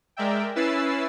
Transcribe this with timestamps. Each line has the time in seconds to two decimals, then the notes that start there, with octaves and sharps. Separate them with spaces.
0.17 G#3 A#4 D5 E5 G5
0.56 C#4 E4 B4 E6 A6 C7